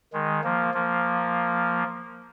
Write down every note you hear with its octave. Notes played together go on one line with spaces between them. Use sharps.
D#3 G#3
F3 A#3
F3 A#3